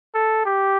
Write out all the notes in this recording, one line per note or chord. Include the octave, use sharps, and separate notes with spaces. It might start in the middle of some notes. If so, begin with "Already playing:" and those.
A4
G4